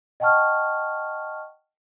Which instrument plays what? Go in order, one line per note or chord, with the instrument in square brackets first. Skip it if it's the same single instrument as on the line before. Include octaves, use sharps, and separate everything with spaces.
[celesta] D#5 F#5 G5 A5 C#6 F6